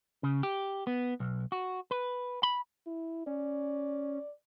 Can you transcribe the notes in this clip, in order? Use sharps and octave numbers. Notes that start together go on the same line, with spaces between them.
C#3
G4
B3
B1
F#4
B4
B5
E4
C#4 D5